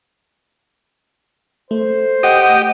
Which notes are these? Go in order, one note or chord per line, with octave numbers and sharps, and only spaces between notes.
A3 C5
G4 D#5 F#5